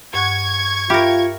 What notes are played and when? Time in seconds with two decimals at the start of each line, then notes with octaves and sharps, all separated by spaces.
0.14 G2 F#5 C#6 F#6 G#6
0.90 F4 G4 A#4 E5 B5 F6